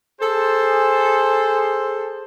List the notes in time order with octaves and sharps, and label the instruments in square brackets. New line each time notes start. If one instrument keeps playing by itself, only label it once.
[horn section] G#4 A4 C5